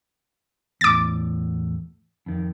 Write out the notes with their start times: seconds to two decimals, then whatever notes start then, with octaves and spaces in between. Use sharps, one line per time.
0.81 E2 A2 D6 A6
2.26 F2 D#3